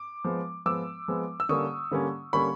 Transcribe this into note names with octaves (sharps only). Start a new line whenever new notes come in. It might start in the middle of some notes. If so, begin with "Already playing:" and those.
Already playing: D6
F3 G#3 B3
F3 G#3 B3 D6 E6
F3 G#3 B3
E6
D3 G3 A#3 C#4 C#6 D#6
D3 G3 A#3 C#4
D3 G3 A#3 C#4 B5 C#6